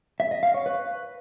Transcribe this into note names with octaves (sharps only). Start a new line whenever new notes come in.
E5
D#5
F5
C#5
B4